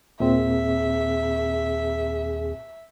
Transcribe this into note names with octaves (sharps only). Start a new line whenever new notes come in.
D#2 A#2 C4 G#4 E5